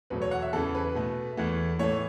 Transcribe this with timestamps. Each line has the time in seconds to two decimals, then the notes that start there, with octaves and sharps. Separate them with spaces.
0.10 E2 B2 F#3 A3 B4
0.22 C#5
0.31 F#5
0.42 E5
0.53 E2 C#3 E3 A4
0.75 B4
0.95 B2 A3
1.37 E2 E3 A3
1.79 A2 E3 A3 C#5